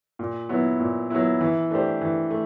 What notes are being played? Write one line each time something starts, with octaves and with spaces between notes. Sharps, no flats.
A#2
F#3 B3 E4
A#2
F#3 B3 E4
E3
A3 D4 G4 C5
E3
A3